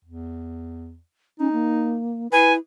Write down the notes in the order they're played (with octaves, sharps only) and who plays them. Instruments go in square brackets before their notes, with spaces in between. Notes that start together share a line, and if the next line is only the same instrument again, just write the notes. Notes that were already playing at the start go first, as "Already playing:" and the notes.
[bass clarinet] E2
[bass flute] C#4 [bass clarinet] D#4
[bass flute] A#3
[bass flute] E4 [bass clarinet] B4 [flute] G#5